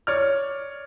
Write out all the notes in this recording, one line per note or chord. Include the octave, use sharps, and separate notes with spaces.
C#5 D5 F6